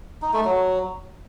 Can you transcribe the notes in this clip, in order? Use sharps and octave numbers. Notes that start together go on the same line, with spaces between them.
D#4
A3
F#3